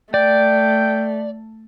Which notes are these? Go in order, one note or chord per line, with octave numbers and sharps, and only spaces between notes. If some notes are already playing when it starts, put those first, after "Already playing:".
A3 D5 G5